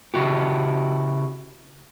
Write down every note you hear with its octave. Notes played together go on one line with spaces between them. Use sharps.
C#3 E4 F#4 G4